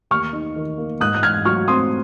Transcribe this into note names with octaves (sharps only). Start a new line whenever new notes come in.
D#2 C#6 F6
D#4
D#3
A#3
G#2 D#6 F#6
F#6
G#2 F6 G#6
F#3 C#6 F6
C4 C6 D#6